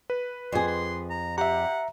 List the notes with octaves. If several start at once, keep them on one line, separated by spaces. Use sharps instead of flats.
B4
F2 G#4 C6
C6
A#5
G4 E5 F#5 A#5